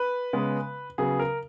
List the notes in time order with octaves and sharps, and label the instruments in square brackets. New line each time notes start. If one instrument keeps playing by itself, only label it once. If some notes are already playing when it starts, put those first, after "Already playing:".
Already playing: [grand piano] B4
C#3 G#3 B3
C#3 F#3 B3 G#4
A#4